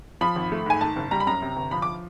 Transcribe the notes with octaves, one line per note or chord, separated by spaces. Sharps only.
F3 B5
G#1
A3
G#2 G#5
D#3 A5
F#1
G3 A#5
B5
F#2 A#5
C3
G1
F3 B5
D6